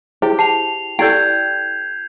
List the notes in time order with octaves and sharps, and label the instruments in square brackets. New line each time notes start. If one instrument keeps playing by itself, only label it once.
[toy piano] E4 G#4 C5 [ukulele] G4
[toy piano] G5 A5 [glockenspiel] C7 F7
[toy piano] E4 G4 [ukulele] A4 D5 G5 [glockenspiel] G6 G#6 C7